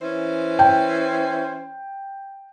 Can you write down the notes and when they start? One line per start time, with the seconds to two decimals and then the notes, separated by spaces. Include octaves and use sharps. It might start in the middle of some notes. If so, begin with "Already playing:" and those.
0.02 E3 C#4 C5
0.59 G5